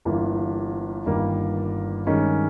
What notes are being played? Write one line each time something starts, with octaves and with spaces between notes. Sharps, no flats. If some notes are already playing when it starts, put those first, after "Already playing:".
G1 G2 E3 A#3
G1 G2 D#3 G3 A#3
G2 D#3 G#3 C#4